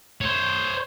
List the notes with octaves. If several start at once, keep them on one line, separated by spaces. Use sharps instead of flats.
C5 C#5